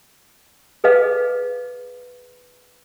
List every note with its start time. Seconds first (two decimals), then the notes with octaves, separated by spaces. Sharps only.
0.84 G#4 A4 B4 D#5 F5